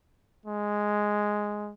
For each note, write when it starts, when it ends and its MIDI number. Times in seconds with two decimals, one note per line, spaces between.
0.46 1.72 56